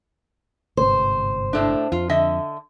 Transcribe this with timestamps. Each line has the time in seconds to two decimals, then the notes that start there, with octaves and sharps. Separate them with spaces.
0.77 G1 G#2 C3 C5
1.53 A2 A3 D4
1.92 F2 F4
2.09 D3 D#5 E5